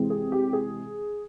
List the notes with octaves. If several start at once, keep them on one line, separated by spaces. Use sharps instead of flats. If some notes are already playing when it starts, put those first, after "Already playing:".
Already playing: C3 E3 G#3 C4
G#4
G4
G#4